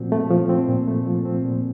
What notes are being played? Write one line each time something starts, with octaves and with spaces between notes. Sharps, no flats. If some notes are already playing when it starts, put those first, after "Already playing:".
Already playing: A#2 F3 A3 C4 F#4
A3
F3
C4
A#2
A3
F3
C4
A#2